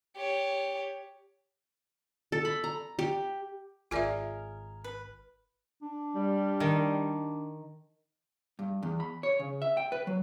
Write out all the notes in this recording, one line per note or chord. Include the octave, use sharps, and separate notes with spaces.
G4 C#5
A4
B5
A#5
G4
G#1 F4 G#4 A#4 D5 E5 F6
B4
D4
G3
D#3
G2
E2
B5
C#5
C#3
E5
G5
B4
F#3